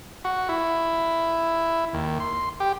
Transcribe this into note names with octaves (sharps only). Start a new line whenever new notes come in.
F#4
E4
D#2
C6
G4